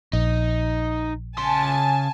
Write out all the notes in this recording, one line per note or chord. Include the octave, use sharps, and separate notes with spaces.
A#1 D#4
C#3 G#5 A5 C6